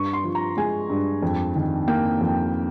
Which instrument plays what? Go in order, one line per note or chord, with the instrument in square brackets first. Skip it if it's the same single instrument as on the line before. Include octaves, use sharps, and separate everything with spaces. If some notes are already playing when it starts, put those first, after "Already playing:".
Already playing: [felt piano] G2 C#6
C6
F3
A#5
G#3 G#5
G2
F2
D#3
A#3 G5
F2